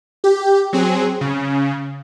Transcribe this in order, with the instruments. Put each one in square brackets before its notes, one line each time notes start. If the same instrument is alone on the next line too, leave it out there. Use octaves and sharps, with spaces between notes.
[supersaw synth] G4
F#3 C4 G#4
C#3